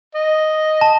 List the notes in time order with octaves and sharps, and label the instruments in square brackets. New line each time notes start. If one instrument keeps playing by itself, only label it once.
[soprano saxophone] D#5
[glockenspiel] A5